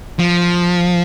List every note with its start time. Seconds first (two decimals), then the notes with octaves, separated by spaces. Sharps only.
0.19 F3